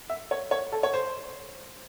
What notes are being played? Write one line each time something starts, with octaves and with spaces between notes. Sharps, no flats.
E5
C#5
C#5
A4
C#5
C5